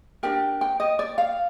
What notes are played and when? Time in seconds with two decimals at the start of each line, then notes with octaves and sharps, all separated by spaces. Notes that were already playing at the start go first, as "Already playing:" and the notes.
0.23 D4 G4 A#4 G5
0.61 G5
0.80 D#5
0.99 D5
1.18 F5